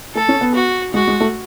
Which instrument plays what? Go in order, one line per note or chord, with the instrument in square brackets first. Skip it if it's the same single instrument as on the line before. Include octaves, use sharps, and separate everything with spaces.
[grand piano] A3 [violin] A4
[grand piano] C#4
B3
[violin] F#4
[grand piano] G#3 [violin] F#4
[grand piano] G#3
A3